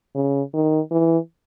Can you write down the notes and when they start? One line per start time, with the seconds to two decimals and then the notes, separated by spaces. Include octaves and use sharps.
0.16 C#3
0.54 D#3
0.91 E3